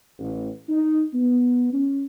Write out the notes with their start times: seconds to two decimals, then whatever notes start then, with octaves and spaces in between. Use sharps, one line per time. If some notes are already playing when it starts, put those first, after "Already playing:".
0.19 A1
0.69 D#4
1.14 B3
1.73 C#4